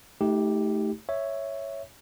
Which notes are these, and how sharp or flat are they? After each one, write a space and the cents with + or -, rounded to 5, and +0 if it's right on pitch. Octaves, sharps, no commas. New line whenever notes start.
A3 -10 D#4 +35 G4 +0
C#5 +0 E5 +0